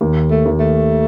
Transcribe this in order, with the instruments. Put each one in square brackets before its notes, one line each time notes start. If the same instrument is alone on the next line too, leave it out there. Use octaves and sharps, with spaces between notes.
[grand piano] D#2
[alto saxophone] A3
[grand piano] D#2
[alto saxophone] A3